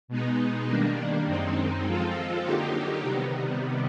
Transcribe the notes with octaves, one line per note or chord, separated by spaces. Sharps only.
B2 G#3 B3 D#4
D#3 G3 A#3 D4
F#2 D#3 G#3 C4 D#4
F3 G#3 C4 F4 A4
D3 F#3 A#3 D#4 G4
C3 D#3 G3 B3